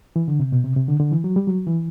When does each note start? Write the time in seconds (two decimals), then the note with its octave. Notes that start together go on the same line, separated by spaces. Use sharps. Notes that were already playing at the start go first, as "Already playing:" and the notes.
0.16 E3
0.28 D3
0.40 C3
0.52 B2
0.64 C3
0.76 C3
0.88 D3
1.00 D3
1.12 E3
1.24 F#3
1.36 G3
1.47 F#3
1.66 E3